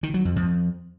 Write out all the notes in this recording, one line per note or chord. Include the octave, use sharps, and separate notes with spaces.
D#3
F#3
F2
F2